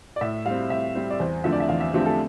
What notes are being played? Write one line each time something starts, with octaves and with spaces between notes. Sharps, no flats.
D5
A2 E5
G3 C4 F5
A2 E5
G3 C4 C5
D5
E2 C5
D3 F3 A3 C4 E5
D5
E5
E2 F5
E5
D3 F3 A3 C4 G4
A4